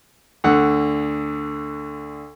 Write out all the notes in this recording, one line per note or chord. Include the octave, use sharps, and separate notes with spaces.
D2 D3 F#5